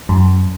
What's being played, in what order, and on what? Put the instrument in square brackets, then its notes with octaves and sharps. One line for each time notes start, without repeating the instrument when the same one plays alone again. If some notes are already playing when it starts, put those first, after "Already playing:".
[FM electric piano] F#2